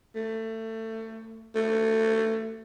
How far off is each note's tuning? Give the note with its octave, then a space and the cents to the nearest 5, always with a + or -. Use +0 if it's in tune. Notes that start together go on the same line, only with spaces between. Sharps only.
A3 +25
A3 +20